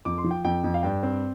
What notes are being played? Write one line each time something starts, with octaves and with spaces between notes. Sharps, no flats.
F2 D6
C6
F3
G5
F2 G5
F2
F5
G2 G5
C4